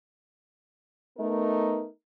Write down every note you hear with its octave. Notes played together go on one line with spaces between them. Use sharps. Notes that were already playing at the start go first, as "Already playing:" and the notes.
A3 B3 D#4 A#4